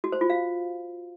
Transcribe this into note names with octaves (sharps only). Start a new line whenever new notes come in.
F#4
C5
F4
F5